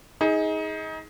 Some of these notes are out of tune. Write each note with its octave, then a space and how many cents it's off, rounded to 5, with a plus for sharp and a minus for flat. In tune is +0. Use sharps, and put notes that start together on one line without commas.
D#4 +25 G#4 +0